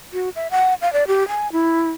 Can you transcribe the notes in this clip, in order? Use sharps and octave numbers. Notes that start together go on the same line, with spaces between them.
F#4
E5
F#5
F5
D5
G4
G#5
E4